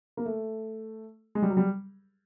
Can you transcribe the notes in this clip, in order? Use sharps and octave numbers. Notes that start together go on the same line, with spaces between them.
A#3
A3
G#3
G3
F#3
G3